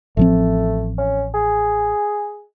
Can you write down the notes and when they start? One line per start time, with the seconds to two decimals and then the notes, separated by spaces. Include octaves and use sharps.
0.17 A1 F3 A3 C4
0.98 C#4
1.34 G#4